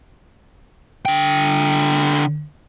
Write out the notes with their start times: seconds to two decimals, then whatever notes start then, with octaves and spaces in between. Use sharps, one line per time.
1.05 D3 G5